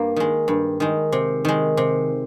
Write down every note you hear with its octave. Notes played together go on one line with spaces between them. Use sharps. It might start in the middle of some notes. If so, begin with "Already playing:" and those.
Already playing: G2 A#3
D#3 G#3
G2
D#3 G#3
C3
D#3 G#3
C3